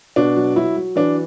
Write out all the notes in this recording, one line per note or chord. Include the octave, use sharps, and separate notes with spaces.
B2 D4
F#3
F#3 E4
F#3
E3 D4